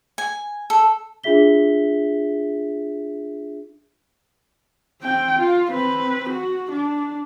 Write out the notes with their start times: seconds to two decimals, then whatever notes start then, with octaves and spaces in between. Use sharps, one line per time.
0.18 G#5
0.70 A4
1.24 D4 F4 G#4 E5 B6 G7
5.02 C4 G5
5.39 F4
5.72 C4 B4
6.29 F#4
6.71 D4